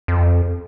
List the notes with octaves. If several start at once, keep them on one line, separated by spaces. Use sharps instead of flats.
F2